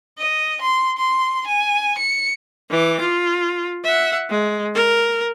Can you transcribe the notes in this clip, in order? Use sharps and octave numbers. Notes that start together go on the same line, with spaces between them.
D#5
C6
C6
G#5
C#7
E3 D6
F4
E5 F#5
G#3
A#4